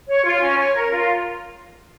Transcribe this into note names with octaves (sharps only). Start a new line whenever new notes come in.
C#5
F4
C#4
C#5
A#4
F4